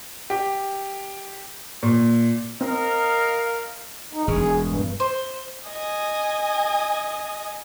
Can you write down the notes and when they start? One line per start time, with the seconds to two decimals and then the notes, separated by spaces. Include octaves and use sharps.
0.30 G4
1.83 A#2
2.61 C4 A#4 D#5 F5
4.13 D#4
4.28 E1 G#4
4.65 G2
5.00 C5
5.68 D#5 G#5